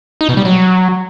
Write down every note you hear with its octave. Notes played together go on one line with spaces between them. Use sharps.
D#4
B2
G3
F#3